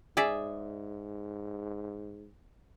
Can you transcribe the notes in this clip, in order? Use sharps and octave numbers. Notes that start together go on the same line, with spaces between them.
G#2 G#4 D5 E5